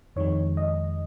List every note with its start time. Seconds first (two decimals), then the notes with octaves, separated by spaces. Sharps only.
0.16 F2 D#3 G#3 C#5
0.57 D#5